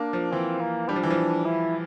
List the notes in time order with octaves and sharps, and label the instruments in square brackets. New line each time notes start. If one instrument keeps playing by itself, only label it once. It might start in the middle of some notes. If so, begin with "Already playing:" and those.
Already playing: [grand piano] A#3 [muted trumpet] D4
[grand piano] F3
[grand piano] E3 [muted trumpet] C4
[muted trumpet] A#3
[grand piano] G3 [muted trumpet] D4
[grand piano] F3
E3
F3
[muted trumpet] E4